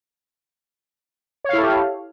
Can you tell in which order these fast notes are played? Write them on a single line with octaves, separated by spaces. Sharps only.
C#5 F5 E4 A4 G4